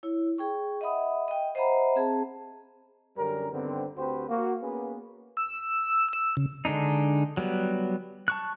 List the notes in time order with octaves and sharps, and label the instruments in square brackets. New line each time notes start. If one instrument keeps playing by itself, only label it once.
[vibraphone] E4 C#5
G#4 G5 C#6
D#5 E5 F#5 B5 D#6
D#5 G5
C5 D#5 E5 F#5 A#5 B5
C4 G#4 A5
[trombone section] F#2 D3 G3 C#4 A#4
G2 D3 D#3 B3 C4
D2 C4 F#4 G4 B4 C5
A#3 F#4
A#3 B3 C#4 G#4 B4
[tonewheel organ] E6
E6
C#3
[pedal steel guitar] D3 G#3 D4 D#4
F#3 G3 B3
A5 C#6 F#6